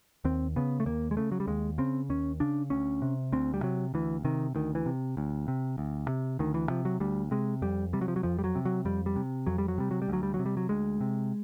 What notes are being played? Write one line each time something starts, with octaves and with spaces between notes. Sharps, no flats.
D#2 C4
C#3 B3
A3
D#2 A#3
G#3
C#3 A3
F#3
G3
D#2 G#3
C#3 C4
D#2 C#4
C#3 D4
D2 C#4
C3
D2 C4
G3
C3 F#3
D2 E3
C3 D#3
D2 D#3
E3
C3
D2
C3
D2
C3
D2 D#3
E3
C3 F3
F#3
D2 G3
C3 G#3
F2 G3
C3 G3
F#3
F3
F#3
F2 F3
G3
F#3
C3
F#3
F2 G3
G3
C3
F2 F#3
G3
F#3
C3 G3
F#3
G3
D2 F#3
G3
F#3
C3
G3
F#3
D2 G#3
C3